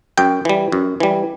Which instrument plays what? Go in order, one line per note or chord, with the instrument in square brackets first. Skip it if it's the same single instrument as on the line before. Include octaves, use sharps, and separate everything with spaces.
[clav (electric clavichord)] F#2 G5
E3 G3
F#2
E3 G3